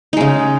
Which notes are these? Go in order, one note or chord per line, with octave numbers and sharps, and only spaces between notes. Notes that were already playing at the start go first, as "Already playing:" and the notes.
C#3 G#3 D#4